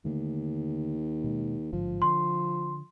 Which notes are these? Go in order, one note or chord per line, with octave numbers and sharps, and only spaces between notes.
D#2 D3 A3
B2 G#3
A1 G#2 D3 F3
D3 C6